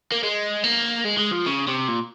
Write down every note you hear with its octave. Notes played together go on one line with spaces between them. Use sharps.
A#3
G#3
A#3
G#3
G#3
F3
C#3
C3
A#2